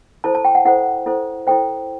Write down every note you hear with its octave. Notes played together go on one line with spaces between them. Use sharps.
E4 A4 C5 A5
A5
G5
F#5
E4 A4 C5 F#5
E4 A4 C5
E4 A4 C5 G5